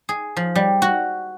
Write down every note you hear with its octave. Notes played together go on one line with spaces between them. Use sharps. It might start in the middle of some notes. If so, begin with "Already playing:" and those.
G#4
F3
G3
F#4